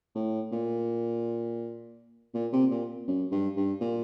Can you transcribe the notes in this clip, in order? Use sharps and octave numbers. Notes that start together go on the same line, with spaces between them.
A2
A#2
A#2
C3
A#2
F#2
G2
G2
A#2